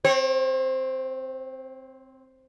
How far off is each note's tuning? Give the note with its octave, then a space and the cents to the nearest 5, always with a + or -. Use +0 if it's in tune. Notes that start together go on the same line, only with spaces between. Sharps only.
C4 +0 C#5 -45